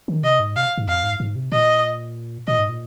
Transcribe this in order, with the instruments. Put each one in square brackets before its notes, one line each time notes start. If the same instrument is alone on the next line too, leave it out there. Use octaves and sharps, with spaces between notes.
[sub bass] D#3
[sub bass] C3 [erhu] D#5
[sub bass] G#2
[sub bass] C3 [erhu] F5
[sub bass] G#2
[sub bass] F2 [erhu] F5
[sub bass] G#2
G#2
C3
[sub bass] A#2 [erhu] D#5
[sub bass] A#2 [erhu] D#5
[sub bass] G#2
A#2